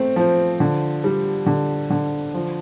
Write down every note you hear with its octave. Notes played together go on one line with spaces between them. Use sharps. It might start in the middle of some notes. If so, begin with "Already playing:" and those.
Already playing: A3 C4
F3
D3
G3
D3
D3
F3